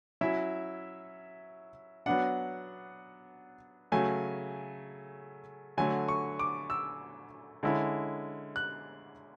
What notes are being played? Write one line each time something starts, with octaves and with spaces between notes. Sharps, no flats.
F#3 C#4 E4 E5
F#3 B3 D4 F#5
C#3 F#3 A3 G#5
D3 F#3 A3 G#5
C#6
D6
E6
D3 G#3 C#4 E4
F#6